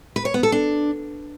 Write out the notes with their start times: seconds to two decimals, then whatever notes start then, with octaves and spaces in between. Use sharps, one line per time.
0.16 B4
0.25 C#5
0.34 B3
0.43 A4
0.52 D4